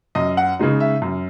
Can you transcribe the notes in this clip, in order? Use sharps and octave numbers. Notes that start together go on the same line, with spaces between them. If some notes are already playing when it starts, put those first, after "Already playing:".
F#2 D#5
F#5
C#3 G#3 D#4
E5
F#2